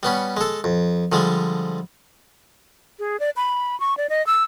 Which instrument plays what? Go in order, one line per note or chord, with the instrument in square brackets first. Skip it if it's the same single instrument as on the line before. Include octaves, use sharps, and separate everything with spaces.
[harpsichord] G3 B3 C#4
G#3 A4
F2
D3 F3 G3 G#3
[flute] G#4
D5
B5
C#6
D5
D#5
E6